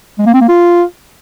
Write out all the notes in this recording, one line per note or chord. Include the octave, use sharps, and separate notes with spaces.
G#3
A#3
C4
A#3
F4